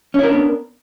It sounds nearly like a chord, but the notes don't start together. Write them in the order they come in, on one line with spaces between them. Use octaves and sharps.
C#4 E4 A#4 D4 B3